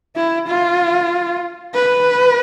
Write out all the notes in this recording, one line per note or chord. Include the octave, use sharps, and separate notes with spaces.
E4
F4
B4